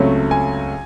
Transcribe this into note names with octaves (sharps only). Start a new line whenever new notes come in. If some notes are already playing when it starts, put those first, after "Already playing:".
Already playing: C#2 C3 F#3 A3 C#4
G#5